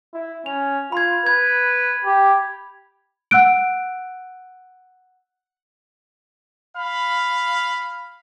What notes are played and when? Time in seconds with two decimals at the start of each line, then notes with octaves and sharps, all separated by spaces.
0.13 E4
0.46 C#4 F7
0.92 F4 B5 G#6
1.27 B4 G#6
2.05 G4
3.31 F#5 E6 F#6 D7
6.77 F5 B5